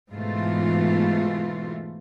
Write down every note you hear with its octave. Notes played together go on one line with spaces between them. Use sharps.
G#2 B2 E3 A3 F4